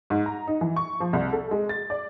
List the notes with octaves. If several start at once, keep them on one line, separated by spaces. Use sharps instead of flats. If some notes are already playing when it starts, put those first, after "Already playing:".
G#2
A#5
D#4
E3
C#6
F3
C2
A4
G#3
A6
D5